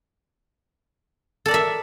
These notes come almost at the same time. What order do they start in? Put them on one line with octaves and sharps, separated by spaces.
A4 D5 A#4 E5